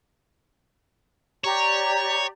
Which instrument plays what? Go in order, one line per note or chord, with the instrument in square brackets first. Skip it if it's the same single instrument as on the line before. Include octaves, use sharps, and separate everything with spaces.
[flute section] G4 D5 A#5 [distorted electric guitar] C#5